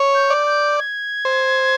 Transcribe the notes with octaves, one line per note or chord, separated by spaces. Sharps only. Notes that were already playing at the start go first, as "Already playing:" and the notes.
Already playing: C#5
G6
D5
G6
G#6
C5